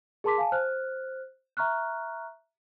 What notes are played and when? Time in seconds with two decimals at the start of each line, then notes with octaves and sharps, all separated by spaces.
0.24 G#4 A#4 A5 C6 D6 B6
0.38 F5 G#5 A5
0.52 C5 F6 F#6
1.57 E5 A#5 C#6 F6 F#6